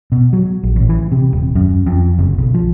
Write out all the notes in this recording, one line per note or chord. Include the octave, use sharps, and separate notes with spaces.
B2
F#3
A#1
A1
E3
C3
D#1
F#2
F2
F#1
B1
F3